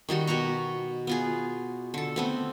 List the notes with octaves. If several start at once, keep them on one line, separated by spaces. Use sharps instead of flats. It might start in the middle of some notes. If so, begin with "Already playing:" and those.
D#3 G3 F#4 G4
B2 F#4 A#5 C#6
B3 F4 G#4
D3 A4
A3 B3 C4